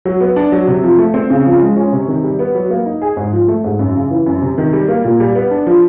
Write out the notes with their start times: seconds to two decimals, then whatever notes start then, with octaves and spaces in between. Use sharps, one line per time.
0.05 F#3
0.21 B3
0.36 D4
0.52 F#3
0.67 C3
0.83 F3
0.98 A3
1.14 C4
1.30 C#3
1.46 F3
1.61 G#3
1.77 C#4
1.92 C3
2.08 D#3
2.24 G3
2.39 B3
2.55 F#3
2.70 A#3
2.86 D#4
3.02 G#4
3.17 G#2
3.33 F3
3.48 A3
3.64 G#2
3.79 F#2
3.95 C#3
4.11 E3
4.26 F#2
4.42 C3
4.58 D#3
4.73 G3
4.88 A#3
5.04 A#2
5.20 G3
5.35 B3
5.51 D4
5.67 F3